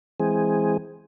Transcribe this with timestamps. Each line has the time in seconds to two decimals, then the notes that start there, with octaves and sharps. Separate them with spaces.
0.20 E3 G#3 C4 G#4